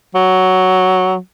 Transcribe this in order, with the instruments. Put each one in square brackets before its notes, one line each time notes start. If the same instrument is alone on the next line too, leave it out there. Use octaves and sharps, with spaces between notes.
[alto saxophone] F#3